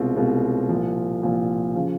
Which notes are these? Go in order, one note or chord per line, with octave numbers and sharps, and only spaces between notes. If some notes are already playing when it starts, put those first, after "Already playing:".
Already playing: C2 B2 G#3 C4 F4
C2 B2 G#3 C4 F4
C2 A#2 F3
C2 A#2 F3
C#3 F3